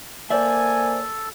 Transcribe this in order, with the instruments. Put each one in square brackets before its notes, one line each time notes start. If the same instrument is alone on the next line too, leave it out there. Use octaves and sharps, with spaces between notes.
[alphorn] A#3 [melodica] A4 [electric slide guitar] C5 D5 E5 [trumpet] G#5